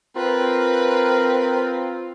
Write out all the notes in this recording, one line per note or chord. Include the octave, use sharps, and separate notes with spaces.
C4 F4 A#4 B4